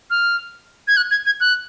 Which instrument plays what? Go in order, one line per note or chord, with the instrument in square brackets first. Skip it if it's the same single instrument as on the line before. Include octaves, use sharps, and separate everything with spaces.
[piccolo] F6
G#6
F#6
G#6
G#6
F#6